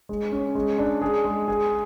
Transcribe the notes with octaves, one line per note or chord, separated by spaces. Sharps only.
G#3
C#4
G#3
D4
G#4
G#3
G#4